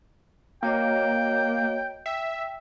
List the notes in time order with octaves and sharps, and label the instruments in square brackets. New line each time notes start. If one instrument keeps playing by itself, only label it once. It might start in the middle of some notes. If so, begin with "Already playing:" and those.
[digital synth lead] A#3 [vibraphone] F#4 C#5 D#5 [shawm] G5
[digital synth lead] E5 [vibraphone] G5